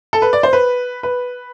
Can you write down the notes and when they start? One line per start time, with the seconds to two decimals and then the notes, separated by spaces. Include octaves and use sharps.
0.13 A4
0.22 B4
0.33 D5
0.43 C5
0.53 B4
1.03 B4